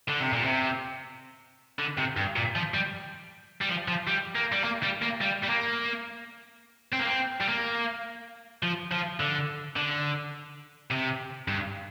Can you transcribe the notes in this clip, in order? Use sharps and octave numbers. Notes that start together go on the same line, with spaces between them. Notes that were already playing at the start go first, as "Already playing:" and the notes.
D3
C3
A#2
C3
D3
C3
G2
A#2
F3
G3
G3
F3
F3
G3
A#3
G3
A#3
G3
A#3
G3
G3
A#3
C4
A#3
C4
G3
A#3
F3
F3
D3
D3
C3
G2